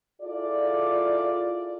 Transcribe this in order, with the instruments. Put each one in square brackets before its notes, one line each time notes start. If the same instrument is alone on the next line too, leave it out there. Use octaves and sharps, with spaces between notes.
[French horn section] E4 F4 G#4 A4 D5